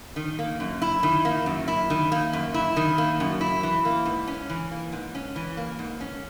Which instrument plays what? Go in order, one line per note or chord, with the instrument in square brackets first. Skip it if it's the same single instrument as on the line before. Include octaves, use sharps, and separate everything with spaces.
[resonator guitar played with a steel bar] D#3
A#3
F#2
E4
D#3
A#3
F#2
E4
D#3
A#3
F#2
E4
D#3
A#3
F#2
E4
E3
A#3
G#2
C#4
E3
A#3
G#2
C#4
E3
A#3
G#2
C#4